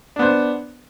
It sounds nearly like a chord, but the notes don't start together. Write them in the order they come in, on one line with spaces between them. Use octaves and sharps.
D4 B3 C5